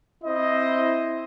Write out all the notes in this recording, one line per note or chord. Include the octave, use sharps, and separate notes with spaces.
C4 E4 C5 D#5